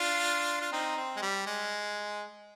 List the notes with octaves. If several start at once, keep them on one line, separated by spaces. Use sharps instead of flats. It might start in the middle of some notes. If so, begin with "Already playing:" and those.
Already playing: D4 F4
F4
C4 D#4
C4
G#3
G3
G#3